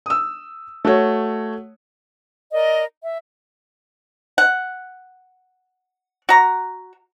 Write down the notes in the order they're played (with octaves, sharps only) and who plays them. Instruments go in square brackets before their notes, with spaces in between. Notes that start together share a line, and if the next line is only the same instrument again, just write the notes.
[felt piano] D#6 E6
A3 F#4 C#5
[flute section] A#4 D5 D#5
E5
[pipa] F#5
F#4 A#5